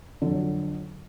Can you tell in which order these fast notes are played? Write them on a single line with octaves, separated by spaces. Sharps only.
D3 F2 F#3